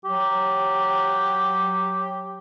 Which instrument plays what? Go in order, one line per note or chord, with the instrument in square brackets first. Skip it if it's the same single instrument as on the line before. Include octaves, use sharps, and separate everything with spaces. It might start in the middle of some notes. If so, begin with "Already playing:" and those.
[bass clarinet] F#3 [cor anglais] G4